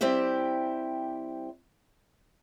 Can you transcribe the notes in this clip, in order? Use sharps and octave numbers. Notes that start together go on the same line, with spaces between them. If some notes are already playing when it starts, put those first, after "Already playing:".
G3 C4 E4 G4 E5